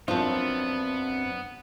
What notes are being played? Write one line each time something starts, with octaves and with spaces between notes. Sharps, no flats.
F#2 F3 B3 C4 D4 F4